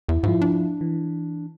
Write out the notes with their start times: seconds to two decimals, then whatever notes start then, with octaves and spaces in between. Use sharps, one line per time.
0.09 E2 E4
0.23 G#2 F3 E4 F4
0.42 D4
0.81 E3